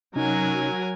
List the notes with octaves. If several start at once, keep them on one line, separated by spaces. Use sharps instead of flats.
C3 F#3 C#4 D#4 A#4 G#5